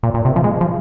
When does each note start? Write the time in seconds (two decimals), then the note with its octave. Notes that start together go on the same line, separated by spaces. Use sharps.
0.03 A#2
0.14 A#2
0.25 C3
0.36 F3
0.44 G#3
0.61 F3